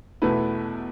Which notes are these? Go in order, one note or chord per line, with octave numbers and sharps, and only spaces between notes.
E2 B2 A3 E4 B4